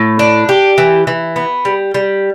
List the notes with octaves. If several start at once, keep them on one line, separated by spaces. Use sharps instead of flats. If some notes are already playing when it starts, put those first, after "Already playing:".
Already playing: A2
D4
G4
E3
E3
B3
G3
G3